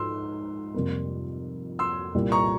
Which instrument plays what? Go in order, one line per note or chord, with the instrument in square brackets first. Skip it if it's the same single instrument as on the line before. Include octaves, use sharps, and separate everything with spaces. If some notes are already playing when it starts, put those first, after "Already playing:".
Already playing: [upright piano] G#2 F3 [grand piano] C6 E6
[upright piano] F2 C3 G3 A#3
[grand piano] C6 E6
[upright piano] C2 A#2 G3 A#3 F4
[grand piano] A#5 C#6